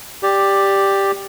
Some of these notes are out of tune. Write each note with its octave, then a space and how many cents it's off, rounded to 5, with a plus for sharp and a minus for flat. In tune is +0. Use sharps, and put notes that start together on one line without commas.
G4 +5 D5 +0